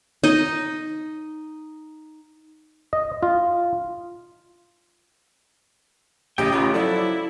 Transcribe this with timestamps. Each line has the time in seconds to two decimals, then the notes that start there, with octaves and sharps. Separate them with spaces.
0.24 D#4 D#5
2.93 D#5
3.23 F4
6.38 A1 C#3 G4 D#5 G5
6.52 D#4 F4 F#4 B4
6.74 F3 F#3 E4 A4 D5